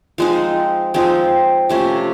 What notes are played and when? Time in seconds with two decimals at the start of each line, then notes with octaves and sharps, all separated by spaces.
0.18 F3 G#3 C4 D#4
0.94 F3 G#3 C4 D#4
1.69 C3 F3 A3 C#4